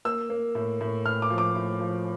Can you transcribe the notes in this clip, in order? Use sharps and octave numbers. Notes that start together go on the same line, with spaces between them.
A#3 E6
A#3
A2
A2
A2 F6
D6
F3
D6
A2
F3